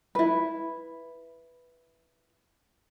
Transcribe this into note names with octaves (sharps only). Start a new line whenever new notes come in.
E4 B4